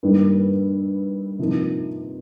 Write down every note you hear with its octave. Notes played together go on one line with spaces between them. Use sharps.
G2 D#3 G3 A#3
C3 F3 A#3 D#4